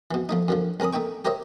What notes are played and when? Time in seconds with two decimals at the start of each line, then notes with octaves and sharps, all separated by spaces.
0.11 B2 E3
0.29 F3 A3 D#4
0.48 F#2 D3 F3
0.80 C2 C#4 A#4 B5 D#6
0.93 A3 D#4 E5 G5 C#6
1.25 G4 A#4 C5 C#5 D#5 E5